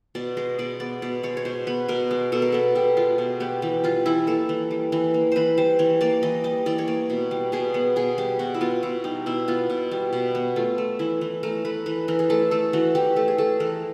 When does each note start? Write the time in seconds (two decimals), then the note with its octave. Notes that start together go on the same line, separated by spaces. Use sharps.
0.15 B2 D5
0.37 G#3 D#5
0.59 B2 D5
0.80 B3 D5
1.02 B2 D5
1.23 G#3 C#5
1.37 C#5
1.45 B2 C5
1.67 B3 B4
1.89 B2 A#4
2.11 G#3
2.32 B2 A4
2.42 A#4
2.52 B3 A4
2.75 B2 G4
2.97 G#3 F4
3.18 B2
3.40 B3 G4
3.62 E3 G4
3.84 G3 F4
4.06 E3 E4
4.27 A#3 A4
4.49 E3
4.71 G3
4.92 E3
5.14 A#3
5.32 E3 B4 C5
5.57 G3 C5
5.79 E3 C#5
6.01 A#3 D5
6.23 E3 D#5
6.44 G3 D#5
6.66 E3 D5
6.78 C#5
6.88 A#3 D5
7.10 B2
7.31 G3
7.52 B2 G#4
7.74 B3
7.96 B2 G#4
8.18 G3 G4
8.39 B2 F#4
8.54 E4
8.61 B3 F4
8.83 B2 E4
9.04 G3 D#4
9.26 B2 E4
9.48 B3 F4
9.70 B2
9.91 G3
10.13 B2
10.35 B3
10.56 A3 F4
10.78 A3
10.99 E3 E4
11.21 E3
11.43 A3 A#4
11.65 A3 B4
11.86 E3 B4
12.08 E3 A#4
12.19 G#4
12.30 A3 A4
12.51 A3 A4
12.73 E3 F#4
12.95 E3 G4
13.16 A3 A4
13.28 G#4
13.38 A3 A4
13.60 E3 A#4